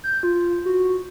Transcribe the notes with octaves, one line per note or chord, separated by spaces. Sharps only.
G6
F4
F#4